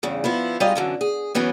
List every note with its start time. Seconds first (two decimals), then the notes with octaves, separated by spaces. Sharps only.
0.03 E2 G2 C#3
0.24 F3 B3 E4
0.60 G3 G#3 D#4 F4 D#5
0.75 F#2 D3 E3
1.01 G#4
1.35 F#2 E3 F#3 B3 C#4